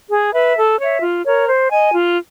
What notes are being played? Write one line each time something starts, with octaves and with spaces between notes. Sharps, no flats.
G#4
B4 E5
A4
C#5 E5
F4
A#4 C#5
C5
D#5 G#5
F4